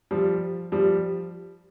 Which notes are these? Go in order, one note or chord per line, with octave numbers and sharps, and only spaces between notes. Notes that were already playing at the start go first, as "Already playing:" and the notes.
F3 G3
F3 G3